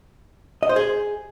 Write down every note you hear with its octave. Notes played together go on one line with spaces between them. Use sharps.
D#5
C5
G#4